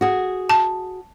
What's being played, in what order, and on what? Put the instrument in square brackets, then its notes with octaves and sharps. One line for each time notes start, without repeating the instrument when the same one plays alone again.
[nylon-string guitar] F#4 G#4
[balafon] A5